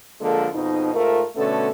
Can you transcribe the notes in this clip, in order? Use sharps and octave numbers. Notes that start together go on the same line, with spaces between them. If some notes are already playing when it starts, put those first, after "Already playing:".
D3 F3 G#3 A#3 A4
F2 B2 F3 D#4
G#2 A3 F4 A#4
B2 D3 A3 B3 C#4 A4